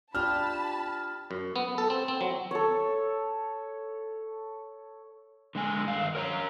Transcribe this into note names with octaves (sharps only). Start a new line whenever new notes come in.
D4 F4 G4 A5 B5 F6
F#2
B3
A4
C4
C4
F#3
A4 C#5
D3 G#3 G#5
G2 D#3 F5
A#4 C#5 A#5